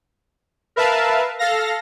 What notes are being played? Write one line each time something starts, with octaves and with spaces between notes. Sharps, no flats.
A#4 B4 E5 F5 A5
A4 F5 A#6